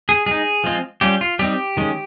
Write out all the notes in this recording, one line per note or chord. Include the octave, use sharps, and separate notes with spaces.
G#4
G#3 D#4 G#4
F3 G#3 C4 F4
G3 C#4 F4 G4
F4
G3 C4 D#4 G4
D#3 G#3 C#4